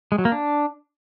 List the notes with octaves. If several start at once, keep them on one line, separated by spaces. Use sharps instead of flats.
G#3
F#3
A#3
D4